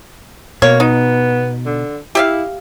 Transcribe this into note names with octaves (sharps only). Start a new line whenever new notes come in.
B2 A#3 C#5
B3 D#4
D3
E4 G4 E5 F5